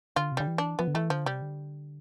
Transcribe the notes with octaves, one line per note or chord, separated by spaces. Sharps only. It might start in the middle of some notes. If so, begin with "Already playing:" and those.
D3 F4
C3
D3 G3
E3
D4
F3 B3
D3
E3 A3
D3 F3
C3 G3
D3